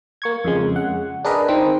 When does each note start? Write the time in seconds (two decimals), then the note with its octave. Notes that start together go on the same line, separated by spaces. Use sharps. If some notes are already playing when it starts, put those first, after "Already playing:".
0.22 A#3 C#6 G#6
0.45 F2 C#3 G#3
0.76 F#5
1.25 D4 G#4 A#4 B4 D#5
1.48 D#3 C4